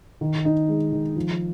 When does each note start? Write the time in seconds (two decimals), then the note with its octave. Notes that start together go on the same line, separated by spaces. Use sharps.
0.21 D#3
0.45 D#4
0.69 G#3
0.92 D#3
1.16 F3